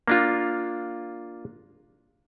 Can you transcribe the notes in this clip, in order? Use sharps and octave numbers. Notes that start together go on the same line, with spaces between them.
A#3 D4 F4